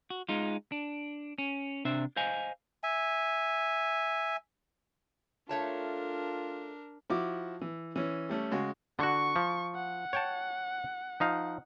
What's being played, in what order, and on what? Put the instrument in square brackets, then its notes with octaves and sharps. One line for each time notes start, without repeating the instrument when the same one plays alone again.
[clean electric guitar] F#4
G#3 D#4 F4
D4
C#4
C3 D4 C5 E5
C5 D#5 F5 G#5
[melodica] E5 G#5
[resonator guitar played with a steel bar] A3 C#5 A5 [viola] D4 A#4 [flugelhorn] F4
[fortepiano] F3 E4 F#4 D6
E3
E3 C#4
G3 A3 C#4
C#3 G#3 F#4
[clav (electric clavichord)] D3 F#4 [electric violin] C#6
[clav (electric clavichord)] F3
[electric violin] F#5
[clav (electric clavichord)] C#5 G5 A5
F3 D#4 F5